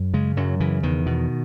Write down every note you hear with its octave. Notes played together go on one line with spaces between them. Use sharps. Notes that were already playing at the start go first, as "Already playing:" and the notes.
Already playing: F#2
C#3 G#3
F#2 F#3
C#3 E3
E2 D#3
B2